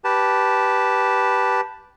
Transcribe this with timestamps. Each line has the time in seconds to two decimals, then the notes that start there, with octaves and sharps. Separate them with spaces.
0.04 G4 B4 A5